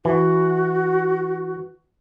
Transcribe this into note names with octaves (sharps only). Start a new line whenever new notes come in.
E3 F#4